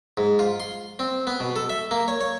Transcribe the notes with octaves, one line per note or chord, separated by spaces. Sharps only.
G#2
F4
C6
C4
B3
B2
A4
E5
A#3
C#5
C#5